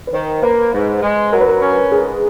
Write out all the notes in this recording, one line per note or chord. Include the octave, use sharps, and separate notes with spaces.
B4
D#3 C5
A#3 B4
G#2
G#3
F#3 A#4
B4
A#4
C#4
G#2 G#4